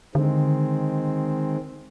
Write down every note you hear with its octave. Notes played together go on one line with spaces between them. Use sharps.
D3 D#3 G#3 C4